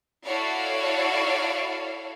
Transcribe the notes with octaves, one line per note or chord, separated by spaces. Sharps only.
E4 F#4 A4 C#5 D5 F5